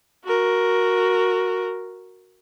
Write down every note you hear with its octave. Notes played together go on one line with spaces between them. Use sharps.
F#4 A#4